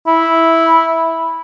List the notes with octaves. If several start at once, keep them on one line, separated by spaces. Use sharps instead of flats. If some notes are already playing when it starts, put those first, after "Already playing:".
E4